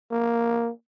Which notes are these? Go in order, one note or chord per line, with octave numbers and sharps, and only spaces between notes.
A#3